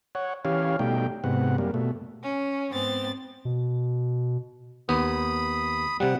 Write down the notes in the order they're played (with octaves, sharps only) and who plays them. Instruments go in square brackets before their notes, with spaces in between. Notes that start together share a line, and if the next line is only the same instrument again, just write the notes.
[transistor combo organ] C#5 F#5
E3 C#4 G4 C#5 F5
B2 G3 A3 D#4 G5
G#2 C3 B3 F#5
F#2 G3 A#3
B2 A3
[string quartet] C#4
G#2 B3 C4 A6
[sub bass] B2
[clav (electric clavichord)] D#2 B3 [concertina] B5 D#6
[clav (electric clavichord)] C3 G3 [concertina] F#5